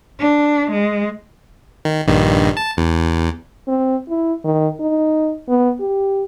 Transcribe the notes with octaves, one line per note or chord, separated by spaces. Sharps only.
D4
G#3
D#3
A#1 G2 D#3
A5
E2
C4
E4
D#3
D#4
B3
G4